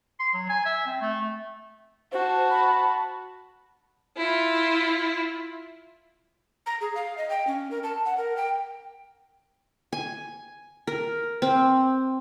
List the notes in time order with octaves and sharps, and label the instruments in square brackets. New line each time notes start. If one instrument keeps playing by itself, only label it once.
[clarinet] C6
F#3
G#5
E5
C4
A3
[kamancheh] F#4 A5 [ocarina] C5
[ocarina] B5
[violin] E4 F4
[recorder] A#5
G#4
F5
D#5
G5
C#4
A#4
A5
F#5
A#4
G5
[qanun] G#5
A#4
C4